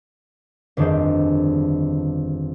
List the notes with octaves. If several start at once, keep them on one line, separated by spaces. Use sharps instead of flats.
G1 F2 D#3 D4 G#4 C5